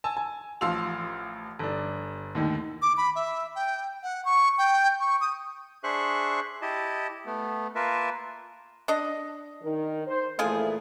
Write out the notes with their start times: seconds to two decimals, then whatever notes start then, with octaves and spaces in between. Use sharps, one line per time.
0.04 G#5 A5 E6
0.17 G#5
0.61 A1 F3 F5 C6 E6 F7
1.59 G1 D4
2.35 D#2 A2 D3 D#3
2.82 D6
2.97 B5
3.16 E5
3.55 G5
4.03 F#5
4.25 C#6
4.58 G5
5.00 C#6
5.21 D#6
5.84 D4 G#4 C5 E5 C#6 F#6
6.62 E4 G4 D#5 A5
7.26 A3 B3
7.75 A#3 F4 A#4 B4 E5 A5
8.88 D4 D#5
9.62 D#3
10.06 C5
10.39 A#2 E3 F3 A3 F4 G#4